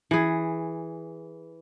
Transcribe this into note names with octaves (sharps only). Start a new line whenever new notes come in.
E3 G#4